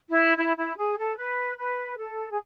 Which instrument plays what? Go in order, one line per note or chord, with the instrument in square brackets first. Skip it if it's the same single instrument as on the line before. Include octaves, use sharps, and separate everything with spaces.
[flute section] E4
E4
E4
G#4
A4
B4
B4
A4
G#4